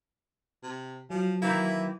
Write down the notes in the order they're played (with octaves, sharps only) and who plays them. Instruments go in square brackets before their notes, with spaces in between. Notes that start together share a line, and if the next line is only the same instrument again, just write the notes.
[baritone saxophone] C3
[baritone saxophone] F3 [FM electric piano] F#3
[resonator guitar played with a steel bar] D#3 E3 A#3 [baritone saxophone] E4